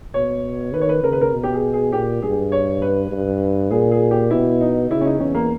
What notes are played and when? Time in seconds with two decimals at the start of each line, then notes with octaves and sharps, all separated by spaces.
0.14 B2 C#5
0.74 D#3 B4
0.81 C#5
0.89 B4
1.03 C#3 A#4
1.12 B4
1.21 A#4
1.33 B2
1.43 G4
1.54 G#4
1.73 G#4
1.92 A#2 G4
2.22 G2 G#4
2.52 C#5
2.82 B4
3.11 G2
3.71 A#2 G#4
3.91 G#4
4.11 G4
4.31 B2 E4
4.61 D#4
4.90 C#3 E4
5.01 C#4
5.05 D#4
5.20 E2 C#4
5.35 A#3